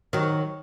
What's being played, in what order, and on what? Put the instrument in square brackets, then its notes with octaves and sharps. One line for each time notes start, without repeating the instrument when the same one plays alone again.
[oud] D#3 F#3